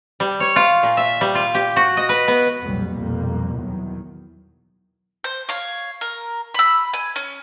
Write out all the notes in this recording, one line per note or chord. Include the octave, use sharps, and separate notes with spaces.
G3
C#5
F4
A#2
E5
G3
F4
G4
F#4
D#5
B4
B3
B1 F2 A#2 F#3 G3
B1 F2 G3 A#3
E2 D#3 F#3
C5
C#5 F5
A#4
B5 E6
G#5
C#4